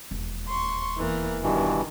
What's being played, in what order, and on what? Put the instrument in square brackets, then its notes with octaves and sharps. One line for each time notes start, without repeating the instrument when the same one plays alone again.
[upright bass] E1 D#2
[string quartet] C6 C#6
E2 E3 A#3
[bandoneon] G2 B2 E3 [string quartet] D#3